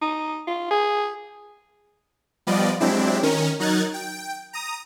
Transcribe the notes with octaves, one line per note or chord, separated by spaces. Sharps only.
D#4
F4
G#4
F3 G3 B3 F4 D5 D#5
F#3 G#3 C4 D4 E4 G4
D#3 C#4 A#4
F#3 D#4 A#4 F#6 G#6 A6
G5
A#5 D#6